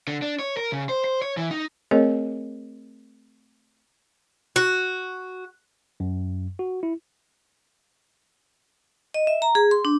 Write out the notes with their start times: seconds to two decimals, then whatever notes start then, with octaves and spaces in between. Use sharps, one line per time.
0.07 D3
0.22 D4
0.39 C#5
0.57 A#4
0.72 C#3
0.89 C5
1.04 C5
1.22 C#5
1.37 E3
1.51 D#4
1.91 A3 C4 G#4 A#4 C#5 D#5
4.56 F#4
6.00 F#2
6.59 F#4
6.83 E4
9.14 D#5
9.27 E5
9.42 A#5
9.55 G#4
9.71 C6
9.85 D4